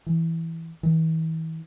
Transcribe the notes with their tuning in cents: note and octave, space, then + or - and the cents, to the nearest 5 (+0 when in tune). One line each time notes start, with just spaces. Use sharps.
E3 -5
E3 -40